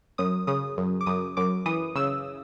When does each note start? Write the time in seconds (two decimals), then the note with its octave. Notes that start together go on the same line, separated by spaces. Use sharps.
0.18 F#2 D#6
0.47 C#3 D#6
0.78 F#2
1.01 D6
1.06 F#2 D#6
1.37 F#2 D6
1.66 E3 D#6
1.95 C#3 E6